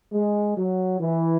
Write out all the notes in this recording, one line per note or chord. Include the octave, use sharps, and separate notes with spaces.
G#3
F#3
E3